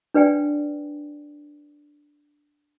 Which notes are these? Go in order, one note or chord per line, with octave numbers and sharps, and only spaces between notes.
D4 B4 D5 G5 G#5